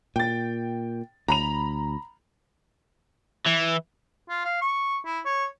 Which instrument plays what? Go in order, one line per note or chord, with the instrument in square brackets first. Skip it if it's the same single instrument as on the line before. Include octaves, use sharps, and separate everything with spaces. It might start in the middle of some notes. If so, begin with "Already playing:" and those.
[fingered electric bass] A#2 [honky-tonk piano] G5 A6
[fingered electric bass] D2 [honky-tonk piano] A#5 B5 F7
[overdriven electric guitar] E3
[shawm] F4
F5
C#6
E4
C#5